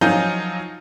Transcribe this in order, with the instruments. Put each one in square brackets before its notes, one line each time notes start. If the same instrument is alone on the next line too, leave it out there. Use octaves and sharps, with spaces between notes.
[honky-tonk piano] F3 F#3 D#4 F4 G#5 G6